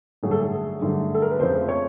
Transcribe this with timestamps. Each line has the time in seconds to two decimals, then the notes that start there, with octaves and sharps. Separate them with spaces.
0.23 G2 D3 F#3 A3 G#4
0.31 A4
0.39 G#4
0.81 G2 D3 F#3 A3
1.14 A4
1.22 A#4
1.31 B4
1.39 F2 C#3 F3 A3 C4 C5
1.69 C#5